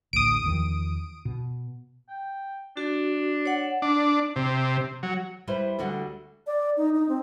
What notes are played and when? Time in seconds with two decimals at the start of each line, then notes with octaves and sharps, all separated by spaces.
0.13 A1 D2 D#6 D7
0.44 E2 D#3 F3
1.25 B2
2.09 G5
2.77 D4 F#4
3.45 C#5 F#5
3.82 D4
4.36 C3
5.03 F#3
5.47 G3 E4 B4 C5
5.79 D2 D3 G3 F#4 F#5
6.47 D5
6.77 D#4
6.94 D#4
7.09 C4